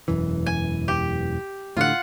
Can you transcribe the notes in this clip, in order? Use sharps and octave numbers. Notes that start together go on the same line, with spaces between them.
E1 F#2 E3
G#5
G4
A2 D3 F4 F#5